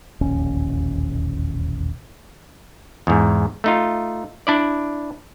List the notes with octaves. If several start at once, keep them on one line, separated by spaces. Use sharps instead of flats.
E1 A#1 D#2 C#4
E2 G#2
A3 D#4 F4
D4 E4 D5